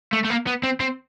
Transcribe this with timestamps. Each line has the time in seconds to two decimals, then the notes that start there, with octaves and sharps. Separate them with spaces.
0.13 A3
0.25 A3
0.30 A#3
0.47 B3
0.63 C4
0.80 C4